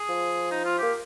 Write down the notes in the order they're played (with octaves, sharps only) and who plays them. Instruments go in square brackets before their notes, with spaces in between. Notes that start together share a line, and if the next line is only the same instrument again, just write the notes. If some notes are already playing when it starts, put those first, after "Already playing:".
Already playing: [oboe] G#4
[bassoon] F3
[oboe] D#4
F4
[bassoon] A#3 [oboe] G4